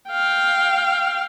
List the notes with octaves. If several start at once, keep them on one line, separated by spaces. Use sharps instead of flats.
F5 G5